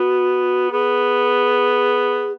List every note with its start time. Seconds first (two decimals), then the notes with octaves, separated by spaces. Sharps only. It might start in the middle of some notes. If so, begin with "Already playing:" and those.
Already playing: B3 F#4
0.71 B3 G#4